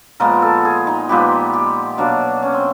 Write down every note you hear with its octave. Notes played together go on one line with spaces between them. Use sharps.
A#2 F3 G#3 B3 A#4
A4
G#4
D#4
A#2 F3 G#3 B3 G4
G4
B2 F#3 A#3 D4
C#4
C4